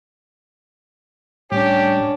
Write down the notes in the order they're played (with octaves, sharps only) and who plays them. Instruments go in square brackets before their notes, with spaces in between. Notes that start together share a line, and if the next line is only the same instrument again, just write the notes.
[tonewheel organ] A2 G3 [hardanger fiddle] C#4 D4 [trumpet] G4